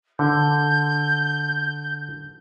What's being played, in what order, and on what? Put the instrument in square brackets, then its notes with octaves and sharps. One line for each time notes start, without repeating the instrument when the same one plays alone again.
[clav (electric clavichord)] D3 [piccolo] G6